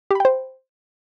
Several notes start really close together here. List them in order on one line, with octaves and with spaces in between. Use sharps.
G4 B5 G5 C5